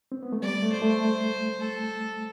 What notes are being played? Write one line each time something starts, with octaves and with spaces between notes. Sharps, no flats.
C4
B3
A3
G3 D5
A3
C5
A3
A4